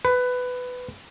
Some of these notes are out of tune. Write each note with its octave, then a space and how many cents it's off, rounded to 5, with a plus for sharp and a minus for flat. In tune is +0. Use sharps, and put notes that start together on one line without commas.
B4 +15